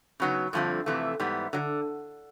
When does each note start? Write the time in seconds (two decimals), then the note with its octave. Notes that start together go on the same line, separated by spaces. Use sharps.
0.20 C#3 F#3 B3 D#4
0.53 G2 D3 F3 A3 C4
0.86 F2 C3 E3 A3
1.20 G#2 E3 G3 B3
1.53 D3 F#3